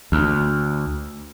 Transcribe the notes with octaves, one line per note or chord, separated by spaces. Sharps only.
D2